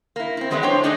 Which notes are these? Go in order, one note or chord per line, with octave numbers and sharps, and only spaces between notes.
A#3 E4
C4 E4
E3 F#3 G#3 B3 D4 E4
D4 C5 C#5 G5 A5
A3 D4 D#4 G#4 B4 D#5